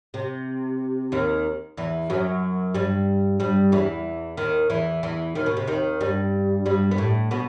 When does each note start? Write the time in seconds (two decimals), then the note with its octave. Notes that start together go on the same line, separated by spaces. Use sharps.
0.14 C3
1.12 D#2 D#3
1.77 E2 E3
2.10 F#2 F#3
2.75 G2 G3
3.40 G2 G3
3.72 E2 E3
4.37 D#2 D#3
4.70 E2 E3
5.03 E2 E3
5.35 D#2 D#3
5.46 B2
5.57 C3
5.67 D#2 D#3
6.01 G2 G3
6.66 G2 G3
6.91 B3
6.98 A2 A3
7.31 B2 B3